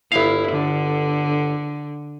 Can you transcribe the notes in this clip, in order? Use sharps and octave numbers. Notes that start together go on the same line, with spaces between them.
G1 E4 F5
D3